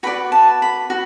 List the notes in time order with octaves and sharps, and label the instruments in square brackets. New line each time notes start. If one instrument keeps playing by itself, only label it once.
[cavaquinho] F#4 B4 D5 B5
A5
B5
F#4